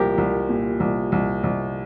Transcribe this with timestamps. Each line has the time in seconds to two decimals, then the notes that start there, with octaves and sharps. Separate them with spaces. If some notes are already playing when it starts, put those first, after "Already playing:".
Already playing: C2 A#2 F3 F4 G4 A#4
0.18 C2
0.49 A#2
0.80 C2
1.12 C2
1.44 C2